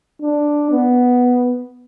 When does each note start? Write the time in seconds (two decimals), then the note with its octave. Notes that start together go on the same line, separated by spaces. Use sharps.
0.22 D4
0.71 B3